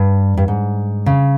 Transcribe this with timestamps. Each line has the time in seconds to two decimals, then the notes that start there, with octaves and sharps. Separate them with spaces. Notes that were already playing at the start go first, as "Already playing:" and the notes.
Already playing: G2
0.37 G2
0.48 G#2
1.06 C#3